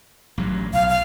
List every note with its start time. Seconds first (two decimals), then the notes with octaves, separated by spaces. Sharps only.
0.38 A1 G2 F#3
0.73 B1 F5
0.89 F5